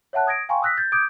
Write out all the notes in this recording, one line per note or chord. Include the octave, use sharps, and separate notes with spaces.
C#5 E5 F#5 A5 F#6
D#6 G#6 A#6 D7
F5 G5 G#5 A#5 C6 C#6
D#6 E6 F#6 A#6 B6
G6 A6
D6 D#6 G6 G#6 D7